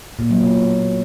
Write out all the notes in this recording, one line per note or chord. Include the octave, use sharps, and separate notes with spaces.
A#2
F#3
B2